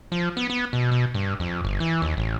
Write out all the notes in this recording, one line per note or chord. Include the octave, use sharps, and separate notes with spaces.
F3
B3
B3
B2
B2
G2
F2
G1
E3
D#2
A1